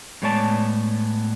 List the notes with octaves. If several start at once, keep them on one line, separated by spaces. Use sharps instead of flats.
A2 G#3 B3 C#5 D5 A5